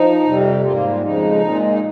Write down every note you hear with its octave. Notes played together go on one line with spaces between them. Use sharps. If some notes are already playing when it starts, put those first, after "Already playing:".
Already playing: F3 D#4
F2 C3 G3
G#2 G3 A#3 F4
F4
F4
F2 C#3 F3 G#3 D#4
A#2 G#3
D#4